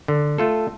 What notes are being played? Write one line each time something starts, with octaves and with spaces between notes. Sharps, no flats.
D3
A3 F4 A4